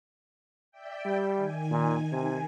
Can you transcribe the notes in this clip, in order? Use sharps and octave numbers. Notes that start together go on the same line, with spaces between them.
D5 E5 G5
G3
D#3 G#5
A#2
C3